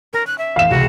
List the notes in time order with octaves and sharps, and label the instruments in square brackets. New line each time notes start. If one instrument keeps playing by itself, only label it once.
[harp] C#4 [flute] A#4
[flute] F#6
E5
[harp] A1 [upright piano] F5 E7
[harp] C#2 C3 [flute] F#4